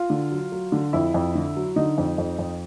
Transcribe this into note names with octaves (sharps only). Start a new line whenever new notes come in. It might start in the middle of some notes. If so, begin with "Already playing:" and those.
Already playing: F4
D3
F#3
F#3
D3
F2 E4
F2
D3
F#3
D3 D#4
F2
F2
F2